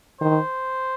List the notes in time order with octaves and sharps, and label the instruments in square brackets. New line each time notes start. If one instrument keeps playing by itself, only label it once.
[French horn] D#3 [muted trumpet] C5